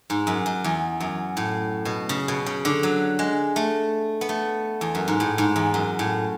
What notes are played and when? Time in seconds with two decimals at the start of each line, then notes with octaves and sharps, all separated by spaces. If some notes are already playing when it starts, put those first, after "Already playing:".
0.10 G#2
0.27 F#2
0.46 F#2
0.64 E2
1.00 F#2
1.37 A2
1.85 B2
2.09 C#3
2.28 B2
2.46 C#3
2.65 D3
2.83 F#3
3.19 G#3
3.56 A3
4.21 B3
4.29 A3
4.81 E2
4.95 F#2
5.08 G#2
5.20 A2
5.38 G#2
5.56 E2
5.74 F#2
5.99 A2